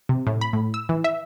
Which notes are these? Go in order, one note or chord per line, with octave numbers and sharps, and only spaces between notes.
C3
A2
B5
A2
E6
E3
E5